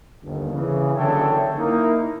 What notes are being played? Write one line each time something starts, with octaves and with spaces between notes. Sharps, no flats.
G1 D#2
C#3 E3
F#1 D3 C#5 E5 G5 A5
A#3 D#4 E4